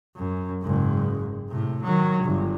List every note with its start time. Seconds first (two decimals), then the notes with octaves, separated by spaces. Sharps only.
0.16 F#2
0.62 F#1 G#2
1.49 A2 C3
1.83 D#3 F#3
2.24 G1